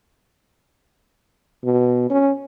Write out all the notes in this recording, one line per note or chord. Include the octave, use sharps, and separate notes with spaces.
B2
C#4